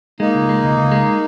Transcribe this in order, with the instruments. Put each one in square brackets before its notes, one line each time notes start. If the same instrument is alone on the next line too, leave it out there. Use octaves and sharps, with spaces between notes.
[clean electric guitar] G#3 [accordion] A#3 D#4
[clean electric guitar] C#2
G#3
C#2
C#2
G#3